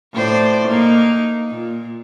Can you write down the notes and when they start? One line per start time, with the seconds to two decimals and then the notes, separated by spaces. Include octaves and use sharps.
0.14 A2 C5 D5
0.68 A#3 D#4
1.49 A#2